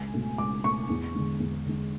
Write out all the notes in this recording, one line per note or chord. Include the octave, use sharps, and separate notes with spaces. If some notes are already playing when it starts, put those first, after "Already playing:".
Already playing: C#2 G#5
B2 A3
C#2 D6
B2 A3 C#6
E2
D3 G#3
E2
D3 G#3